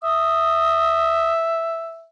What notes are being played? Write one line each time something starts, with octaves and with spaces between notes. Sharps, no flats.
E5 D#6